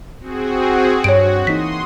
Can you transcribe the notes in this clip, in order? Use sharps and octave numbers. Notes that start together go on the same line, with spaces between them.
C4 F#4 G#4
G2 F#4 C#5 D7
E3 A#3 D#4 C6 D#6 B6